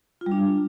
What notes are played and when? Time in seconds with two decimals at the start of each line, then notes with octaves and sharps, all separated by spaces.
0.21 F4
0.26 G3
0.31 D4